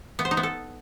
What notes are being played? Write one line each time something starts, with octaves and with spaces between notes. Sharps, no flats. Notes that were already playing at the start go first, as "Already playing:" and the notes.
B3
C5
D#4
B3
A4